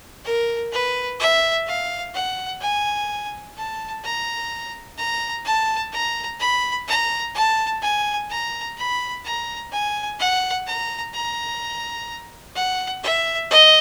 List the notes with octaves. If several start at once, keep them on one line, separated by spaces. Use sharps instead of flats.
A#4
B4
E5
F5
F#5
G#5
A5
A#5
A#5
A5
A#5
B5
A#5
A5
G#5
A#5
B5
A#5
G#5
F#5
A#5
A#5
F#5
E5
D#5